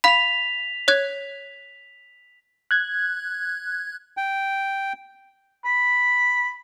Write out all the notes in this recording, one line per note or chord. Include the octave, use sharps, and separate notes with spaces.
F5 B5 B6 F7
C#5 F#6 G#6
F#6 G#6
G5
B5